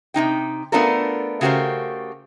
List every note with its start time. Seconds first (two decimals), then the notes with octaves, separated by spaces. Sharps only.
0.14 C3 A#3 D#4 G5
0.72 A3 B3 D4 F4 A4 A#4
1.41 C#3 A3 F#4 G4 A#4 C5